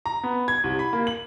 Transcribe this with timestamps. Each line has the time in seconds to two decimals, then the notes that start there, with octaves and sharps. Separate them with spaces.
0.06 A#5
0.23 B3
0.48 G#6
0.64 C2
0.79 B5
0.93 A#3
1.07 F#7